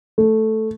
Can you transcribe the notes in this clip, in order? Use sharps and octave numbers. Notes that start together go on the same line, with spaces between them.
A3